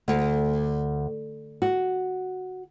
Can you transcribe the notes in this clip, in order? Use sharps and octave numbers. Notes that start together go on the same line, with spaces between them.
D2
F#4